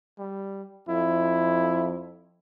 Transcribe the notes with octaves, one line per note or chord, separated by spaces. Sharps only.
G3
F2 E4